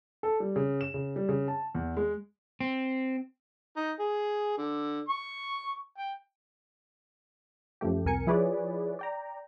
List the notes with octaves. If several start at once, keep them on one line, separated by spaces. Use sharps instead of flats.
A4
G3
C#3
E7
C#3
G3
C#3
A5
E2
G#3
C4
D#4
G#4
D3
C#6
G5
F#2 F3 A3 G4
C2 F2 A#4 G#5 C#7
F3 E4 G#4 B4 C#5 D5
D5 G5 A#5